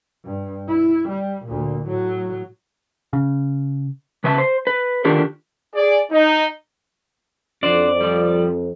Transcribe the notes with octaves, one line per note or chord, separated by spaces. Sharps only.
G2
E4
G3
D2 A#2
A2 F#3
C#3
C#3 B4 E5 G#5 A5
C5
B4
D3 D#3 D4 F4 G4 A#4
G#4 D5
D#4
F2 D4 F#4 C5 D5
F3 G3